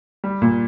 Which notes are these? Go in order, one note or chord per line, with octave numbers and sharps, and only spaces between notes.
G3
A#2